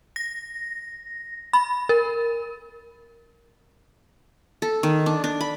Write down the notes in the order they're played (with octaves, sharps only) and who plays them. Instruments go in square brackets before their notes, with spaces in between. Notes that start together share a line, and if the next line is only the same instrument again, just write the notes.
[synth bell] A#6
B5
A#4
[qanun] A4
D#3
D4
D4
B5